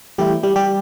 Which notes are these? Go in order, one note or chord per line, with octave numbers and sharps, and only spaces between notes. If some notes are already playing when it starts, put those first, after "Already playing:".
E3 G3 A3 E4 G4
G3 G4
G3 G4